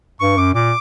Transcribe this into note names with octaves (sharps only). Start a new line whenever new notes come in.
G2 C#6
F#2 D6
A#2 D6